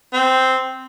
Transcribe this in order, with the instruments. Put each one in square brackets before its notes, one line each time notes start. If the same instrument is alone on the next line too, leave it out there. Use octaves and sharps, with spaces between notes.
[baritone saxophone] C4